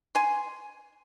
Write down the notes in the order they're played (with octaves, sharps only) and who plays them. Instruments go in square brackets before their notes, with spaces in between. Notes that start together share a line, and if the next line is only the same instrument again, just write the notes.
[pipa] G#5 C6